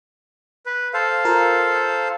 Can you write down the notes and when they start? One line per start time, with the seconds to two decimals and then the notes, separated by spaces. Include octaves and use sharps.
0.66 B4
0.94 A4 C5 F5
1.25 F4 A#4